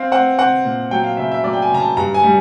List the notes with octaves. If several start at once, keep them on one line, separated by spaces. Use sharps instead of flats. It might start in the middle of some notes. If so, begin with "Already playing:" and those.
Already playing: C4 F5
C4 F#5
C4 F#5
A#2
F#3 G5
F5
C#3 E5
E5
F#3 D5
G5
G#5
C#3 A#5
A5
G2 A#5
G#5
G3